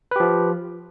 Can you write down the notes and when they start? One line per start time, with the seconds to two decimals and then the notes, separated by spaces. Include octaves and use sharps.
0.11 B4
0.16 G4
0.20 F3